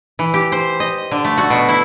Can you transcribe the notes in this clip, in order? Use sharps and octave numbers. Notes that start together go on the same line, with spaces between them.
E3
G4
C5
D#5
D3
A3
F#4
B2
E4